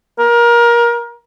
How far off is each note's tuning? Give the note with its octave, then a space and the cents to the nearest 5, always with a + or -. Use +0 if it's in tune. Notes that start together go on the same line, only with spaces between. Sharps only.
A#4 +25